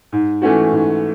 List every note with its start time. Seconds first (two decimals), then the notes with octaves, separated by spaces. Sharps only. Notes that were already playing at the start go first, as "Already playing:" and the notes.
0.12 G#2
0.42 E3 A3 C#4 F#4
0.72 G#2